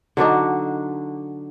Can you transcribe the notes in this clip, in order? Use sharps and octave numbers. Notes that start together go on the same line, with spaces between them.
D3 F#3 D4 D#4